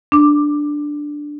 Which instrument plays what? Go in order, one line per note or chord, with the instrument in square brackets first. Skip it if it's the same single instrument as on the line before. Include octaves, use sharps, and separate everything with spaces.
[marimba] D4 D6